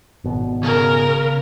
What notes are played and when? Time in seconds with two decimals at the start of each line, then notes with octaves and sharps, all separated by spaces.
0.24 G#1 B2
0.63 C#3 G#4 A#4